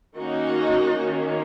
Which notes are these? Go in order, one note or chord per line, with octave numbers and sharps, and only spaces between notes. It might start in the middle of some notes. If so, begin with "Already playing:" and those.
D#3 A#3 C#4 D#4 F#4
D#3 A#3 C#4